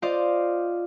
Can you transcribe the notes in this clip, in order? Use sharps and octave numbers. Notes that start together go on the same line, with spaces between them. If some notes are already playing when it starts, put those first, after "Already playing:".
F4 C5 D5 D#5 F5